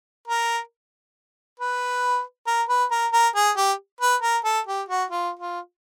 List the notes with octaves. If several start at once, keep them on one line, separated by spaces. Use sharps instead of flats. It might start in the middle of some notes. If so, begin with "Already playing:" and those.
A#4
B4
A#4
B4
A#4
A#4
G#4
G4
B4
A#4
A4
G4
F#4
F4
F4